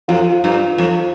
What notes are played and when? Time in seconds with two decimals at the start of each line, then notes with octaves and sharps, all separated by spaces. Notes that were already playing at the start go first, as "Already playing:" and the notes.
0.08 F2 F4
0.44 G2
0.78 F2